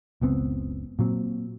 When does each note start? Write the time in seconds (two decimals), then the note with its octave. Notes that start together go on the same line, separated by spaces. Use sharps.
0.21 F#1 C#2 B3 C4
0.99 A#2 F#3 C4